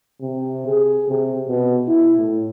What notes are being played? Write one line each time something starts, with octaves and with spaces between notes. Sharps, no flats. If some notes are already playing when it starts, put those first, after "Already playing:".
C3
G#4
C3
B2
E4
A2